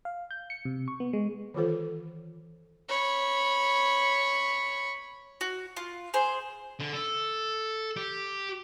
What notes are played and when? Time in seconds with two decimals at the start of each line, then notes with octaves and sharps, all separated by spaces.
0.05 F5
0.31 G6
0.50 C#7
0.65 C3
0.88 C#6
1.00 B3
1.13 G#3
1.54 D#3 E3 F4 A4 C5
2.89 C#5 B5
5.41 F#4
5.77 F4
6.14 G#4 C5
6.80 D3
6.93 A4
7.96 G4